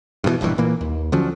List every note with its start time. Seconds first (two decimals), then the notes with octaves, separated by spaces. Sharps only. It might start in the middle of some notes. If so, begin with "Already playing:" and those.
0.24 G2 B2 E3
0.41 E1 A#1 G2 E3
0.58 A#2 E3 A#3
0.81 D#2
1.12 D3 F3 F#3 C#4